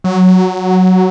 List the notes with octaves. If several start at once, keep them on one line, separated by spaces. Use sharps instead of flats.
F#3